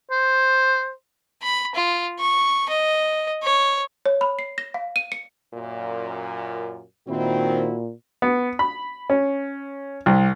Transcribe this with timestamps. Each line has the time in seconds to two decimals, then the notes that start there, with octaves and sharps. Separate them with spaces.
0.11 C5
1.42 B5
1.75 F4
2.19 C#6
2.69 D#5
3.43 C#5
4.06 C#5
4.21 B5
4.39 C7
4.58 A#6
4.74 F5
4.96 D#7
5.12 C#7
5.54 F#2 A#2
7.08 A#2 D#3 C4 E4 F#4
8.22 B3
8.59 B5
9.10 C#4
10.06 C2